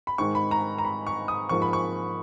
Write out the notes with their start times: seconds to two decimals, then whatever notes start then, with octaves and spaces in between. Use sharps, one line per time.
0.07 B5
0.18 G#2 D#3 G#3 C#6
0.35 B5
0.51 A#5
0.78 A#5
0.85 B5
1.07 C#6
1.28 D#6
1.49 G#2 F3 A#3 C#6
1.62 B5
1.73 C#6